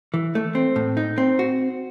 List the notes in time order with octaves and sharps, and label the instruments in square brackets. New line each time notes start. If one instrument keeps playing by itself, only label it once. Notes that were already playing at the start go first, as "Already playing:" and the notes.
[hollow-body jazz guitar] E3
A3
C4
A2
D#4
C4
F#4